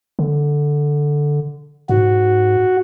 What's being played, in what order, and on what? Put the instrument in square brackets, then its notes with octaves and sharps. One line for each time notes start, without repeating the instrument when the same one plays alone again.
[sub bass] D3
[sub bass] G#2 [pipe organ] F#4